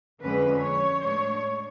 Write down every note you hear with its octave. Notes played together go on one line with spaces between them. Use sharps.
F2 D3 F3 G#3 C#4 B4
C#5
A2 G#3 D4 C#5